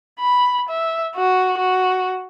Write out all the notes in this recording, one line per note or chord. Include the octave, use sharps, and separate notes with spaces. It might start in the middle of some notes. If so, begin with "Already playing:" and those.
B5
E5
F#4
F#4